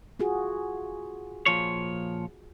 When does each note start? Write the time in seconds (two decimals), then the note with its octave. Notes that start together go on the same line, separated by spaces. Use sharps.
0.19 F4 F#4 G#4
1.46 A#2 F3 C#5